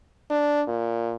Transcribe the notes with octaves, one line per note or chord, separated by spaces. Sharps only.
D4
A#2